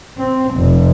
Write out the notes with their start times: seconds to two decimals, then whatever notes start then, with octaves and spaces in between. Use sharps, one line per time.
0.18 C4
0.55 F1